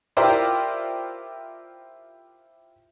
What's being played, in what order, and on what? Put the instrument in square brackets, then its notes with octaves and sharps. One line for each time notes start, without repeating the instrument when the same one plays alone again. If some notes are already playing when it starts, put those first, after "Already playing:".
[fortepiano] E4 F4 G4 A#4 C5 D5